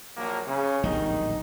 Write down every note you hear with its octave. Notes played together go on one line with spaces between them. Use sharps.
A#1 F#3 A#3
C#3
D1 A#1 D#3 G3 D#4